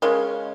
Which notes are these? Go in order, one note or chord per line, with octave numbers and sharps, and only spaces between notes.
C#3 G#3 C#4 A#4